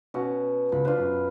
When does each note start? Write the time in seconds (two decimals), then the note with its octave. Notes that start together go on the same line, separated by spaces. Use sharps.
0.14 B2 C#4 F#4
0.72 C#2 B5
0.85 D4 F4 B4 C5
0.98 F#2